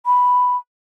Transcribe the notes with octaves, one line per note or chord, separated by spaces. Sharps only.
B5